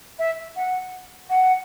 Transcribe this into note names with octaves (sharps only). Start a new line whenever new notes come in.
E5
F#5
F#5